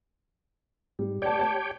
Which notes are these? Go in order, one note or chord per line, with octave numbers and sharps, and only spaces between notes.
G#2 G3
G4 C#5 D5 G5 A5
A5